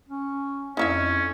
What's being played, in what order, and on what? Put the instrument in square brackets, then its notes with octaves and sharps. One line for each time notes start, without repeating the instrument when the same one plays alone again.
[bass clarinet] C#4
[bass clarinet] F2 [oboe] C#4 [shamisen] D#4 E4 E5